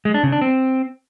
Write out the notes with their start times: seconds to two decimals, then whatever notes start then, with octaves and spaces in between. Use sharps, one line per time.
0.05 G#3
0.14 D4
0.23 C#3
0.32 D4
0.42 C4